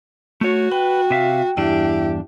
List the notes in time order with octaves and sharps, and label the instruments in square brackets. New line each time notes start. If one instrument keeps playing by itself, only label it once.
[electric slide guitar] A3 C#5 [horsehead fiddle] F#4
[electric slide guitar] B4 [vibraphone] G5
[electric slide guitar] C3 E5 F5
[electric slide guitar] E2 G2 D4 [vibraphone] E4 E5 [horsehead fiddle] G4